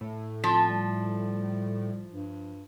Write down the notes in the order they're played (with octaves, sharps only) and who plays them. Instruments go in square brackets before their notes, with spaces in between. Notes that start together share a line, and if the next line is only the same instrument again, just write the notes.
[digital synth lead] A2 [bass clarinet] A3
[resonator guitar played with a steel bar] F3 [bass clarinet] C4
[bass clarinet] G3
G2